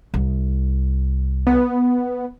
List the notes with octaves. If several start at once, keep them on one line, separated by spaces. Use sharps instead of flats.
C2
B3